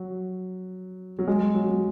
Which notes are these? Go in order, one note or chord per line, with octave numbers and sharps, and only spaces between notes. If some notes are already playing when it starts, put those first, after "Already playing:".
Already playing: F#3
F#3
G#3
F#3
F#3